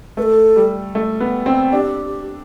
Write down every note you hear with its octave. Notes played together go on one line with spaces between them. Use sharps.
A3 B4
A4
G3
A3
B3
C4
D4 G4